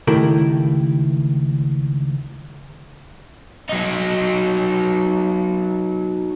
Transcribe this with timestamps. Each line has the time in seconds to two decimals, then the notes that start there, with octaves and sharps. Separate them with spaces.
0.07 C#2 D#3 A3 E4 G4 A#4
3.69 F#3 D#4